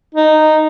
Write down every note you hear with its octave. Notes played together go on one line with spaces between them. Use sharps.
D#4